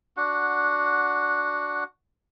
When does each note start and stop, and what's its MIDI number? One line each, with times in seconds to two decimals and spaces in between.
0.17 1.84 62
0.17 1.84 66
0.17 1.84 78